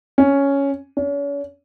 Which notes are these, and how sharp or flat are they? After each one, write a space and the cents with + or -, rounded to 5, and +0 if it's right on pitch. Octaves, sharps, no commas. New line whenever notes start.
C#4 +5
C#4 +40